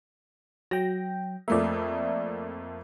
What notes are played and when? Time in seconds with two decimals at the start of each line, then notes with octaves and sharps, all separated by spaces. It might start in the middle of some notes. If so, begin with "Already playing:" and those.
0.71 F#3 G5 A#6
1.48 F2 A3 A#3 D5 E5